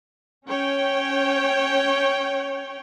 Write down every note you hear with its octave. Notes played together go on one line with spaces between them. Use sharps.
C#4 C#5 G5